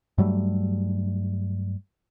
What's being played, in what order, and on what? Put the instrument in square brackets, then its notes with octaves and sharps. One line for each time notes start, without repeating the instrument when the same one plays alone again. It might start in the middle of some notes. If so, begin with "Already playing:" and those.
[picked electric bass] G2 F#3 G3 A3